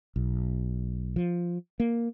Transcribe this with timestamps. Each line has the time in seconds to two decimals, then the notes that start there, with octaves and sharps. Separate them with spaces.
0.16 B1
1.16 F3
1.80 A#3